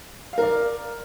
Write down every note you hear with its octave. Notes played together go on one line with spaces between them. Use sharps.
A#4 D5 F5